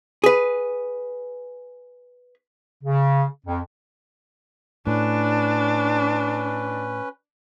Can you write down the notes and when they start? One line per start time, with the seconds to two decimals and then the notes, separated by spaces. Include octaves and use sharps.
0.24 G#4 B4
2.84 C#3
3.47 F2
4.87 A2 C#4 D4 B4